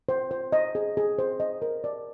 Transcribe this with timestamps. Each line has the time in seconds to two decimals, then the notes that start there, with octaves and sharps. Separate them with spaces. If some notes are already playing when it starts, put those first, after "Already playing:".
0.09 C5
0.31 C5
0.52 D#5
0.75 G#4
0.97 G#4
1.19 C5
1.40 D#5
1.62 A#4
1.84 D5